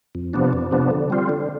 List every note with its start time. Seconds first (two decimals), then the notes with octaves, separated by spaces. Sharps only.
0.15 F2
0.33 C3 F3 B3 D4
0.53 F2
0.71 C3 F3 B3 D4
0.90 D3
1.10 G3 C4 F4
1.29 D3